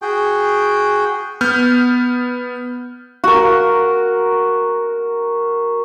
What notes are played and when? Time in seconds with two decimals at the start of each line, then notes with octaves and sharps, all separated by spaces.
0.02 F#4 G#4 G5
1.41 B3 F6 G6
3.24 F#4 A#4